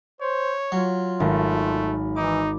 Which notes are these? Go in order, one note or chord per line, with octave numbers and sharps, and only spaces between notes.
C5 C#5
F#3 F4
G#1 A3
E3 D#4 D6